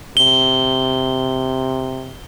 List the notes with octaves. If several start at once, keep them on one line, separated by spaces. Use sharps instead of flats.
C3 G7